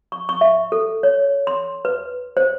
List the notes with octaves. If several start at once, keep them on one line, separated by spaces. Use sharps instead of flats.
C#6
C#6
E5
A4
C#5
C6
B4
C5